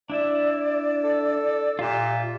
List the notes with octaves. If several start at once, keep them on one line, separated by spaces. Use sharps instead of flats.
D4 E4 D5 E5
A4
A#2 F4 G4 E5